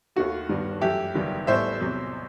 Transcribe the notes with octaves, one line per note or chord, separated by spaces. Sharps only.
D#2 D#3 A3 F#4
G1 G2 D#3 G3 B3
F#2 E3 A3 E4 G4
F#1 E2 D#3 G3 B3
A1 A2 G3 B3 C5 E5
E2 C3 F#3